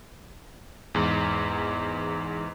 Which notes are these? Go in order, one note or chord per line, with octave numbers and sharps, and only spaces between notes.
E2 G#2